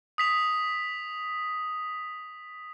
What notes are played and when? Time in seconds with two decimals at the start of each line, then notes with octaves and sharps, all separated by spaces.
0.18 D#6 B6 F7